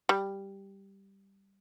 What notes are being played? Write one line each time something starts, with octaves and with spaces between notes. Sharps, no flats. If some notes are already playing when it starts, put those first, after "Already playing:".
G3